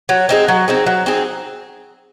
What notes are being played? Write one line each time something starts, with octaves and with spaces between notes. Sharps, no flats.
F#3
C4 D#4 G#4
F#3
C4 D#4 G#4
F#3
C4 D#4 G#4